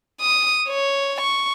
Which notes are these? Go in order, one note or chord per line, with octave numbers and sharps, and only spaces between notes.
D#6
C#5
C#6